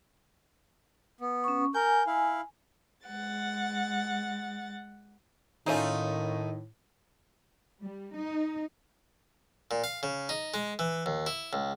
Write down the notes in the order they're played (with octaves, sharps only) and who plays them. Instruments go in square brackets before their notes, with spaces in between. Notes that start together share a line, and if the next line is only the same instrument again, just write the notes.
[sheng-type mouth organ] B3
[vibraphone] C#4 C#6
[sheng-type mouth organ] A#4 G6 [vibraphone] G#5
[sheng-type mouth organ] E4 F5
[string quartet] G#3 F#5 A6
[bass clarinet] A2 [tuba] D#3 [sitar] A3 D#4 [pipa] A#3 C#4 F4
[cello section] G3
D#4
[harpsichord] A#2
F5
C#3
D#4
G#3
E3
D#2
E4
C#2